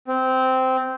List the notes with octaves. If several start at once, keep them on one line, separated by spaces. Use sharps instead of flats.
C4